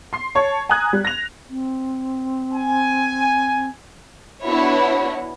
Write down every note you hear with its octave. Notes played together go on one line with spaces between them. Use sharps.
C6 C7
C#5 A5 C#6
G#5 A#5 D#6 F#6 G#6
G3
A#6 F7
C4
G#5
B3 D4 E4 F#4 C#5